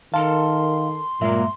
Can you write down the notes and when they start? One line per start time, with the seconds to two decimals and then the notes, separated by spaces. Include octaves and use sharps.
0.14 D#3 A4 A#4 F5 A5 C6
1.21 G2 A#2 F#3 G#3 A#3 E5